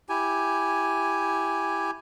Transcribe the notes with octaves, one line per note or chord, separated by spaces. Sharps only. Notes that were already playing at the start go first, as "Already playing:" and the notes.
E4 G4 G#5